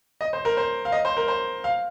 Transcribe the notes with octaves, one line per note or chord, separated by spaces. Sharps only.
D#5
C5
A#4
C5
F5
D#5
C5
A#4
C5
F5